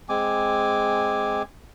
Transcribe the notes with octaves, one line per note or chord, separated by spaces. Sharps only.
G#3 C4 G#5 D6